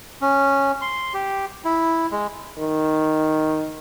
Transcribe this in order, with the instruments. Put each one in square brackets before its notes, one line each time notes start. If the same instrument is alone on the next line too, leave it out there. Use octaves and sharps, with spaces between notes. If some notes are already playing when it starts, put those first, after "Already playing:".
[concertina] C#4
C6
G4
E4
G#3
[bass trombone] D#3